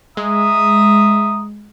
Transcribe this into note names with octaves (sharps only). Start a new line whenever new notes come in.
G#3 E5 A#5 D#6